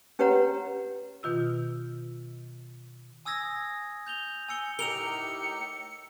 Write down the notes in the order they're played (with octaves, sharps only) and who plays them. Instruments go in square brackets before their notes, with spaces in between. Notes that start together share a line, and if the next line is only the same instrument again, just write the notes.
[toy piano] C#4 G4 B4 C#5 F#5 A#5
[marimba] B2 D#3 F4 E6
[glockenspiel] G#5 D#6 E6 G#6 A#6
G6 F7 G7
G#5 E6 C#7 G7
[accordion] A2 D#4 G4 [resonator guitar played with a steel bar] A#4 [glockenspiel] E6 F7 G7 [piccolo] C#7